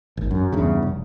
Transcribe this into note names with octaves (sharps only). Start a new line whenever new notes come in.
G#1
F#2
E2 G2 C#3
F1